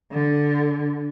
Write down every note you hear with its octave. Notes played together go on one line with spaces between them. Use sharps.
D3